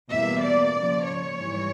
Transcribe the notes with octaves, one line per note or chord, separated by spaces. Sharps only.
E2 B2 G3 A#3 E5
D5
C#3 F3 A#3
C#5
G#2 E3 G3